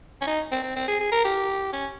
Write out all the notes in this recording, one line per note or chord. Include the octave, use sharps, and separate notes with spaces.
C#4
D#4
C4
C4
C4
G#4
G#4
A#4
G4
C#4